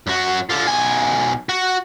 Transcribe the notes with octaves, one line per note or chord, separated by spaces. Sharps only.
F#2 F#4
D3 F4
B1 G#5
F#4